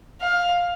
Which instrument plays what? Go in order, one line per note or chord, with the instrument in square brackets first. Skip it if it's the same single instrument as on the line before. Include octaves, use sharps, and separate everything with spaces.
[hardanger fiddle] F5